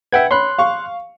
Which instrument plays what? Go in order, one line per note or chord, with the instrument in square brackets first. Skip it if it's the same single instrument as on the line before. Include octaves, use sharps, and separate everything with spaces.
[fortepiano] B4 F#5 [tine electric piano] E5 G5 G#6
[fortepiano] C#5 B5 [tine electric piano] C6 F#6
[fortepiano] F5 C#6